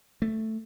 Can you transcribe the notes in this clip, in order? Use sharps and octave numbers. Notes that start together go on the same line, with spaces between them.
A3